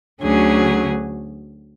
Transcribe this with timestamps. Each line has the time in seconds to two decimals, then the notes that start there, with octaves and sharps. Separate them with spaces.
0.21 D2 D3 F#3 C#4 G#4